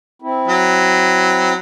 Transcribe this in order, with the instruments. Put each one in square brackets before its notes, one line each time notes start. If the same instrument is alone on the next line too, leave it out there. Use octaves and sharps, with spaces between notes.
[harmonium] C4 E4
[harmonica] F#3